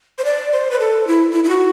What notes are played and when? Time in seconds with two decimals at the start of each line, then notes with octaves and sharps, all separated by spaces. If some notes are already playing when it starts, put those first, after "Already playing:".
0.18 C5
0.25 D5
0.52 C5
0.71 B4
0.79 A4
1.07 E4
1.32 E4
1.44 E4
1.49 F#4